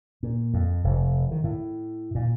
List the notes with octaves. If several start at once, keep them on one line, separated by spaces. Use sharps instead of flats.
A#2
F2
F1
D#3
A2
A#2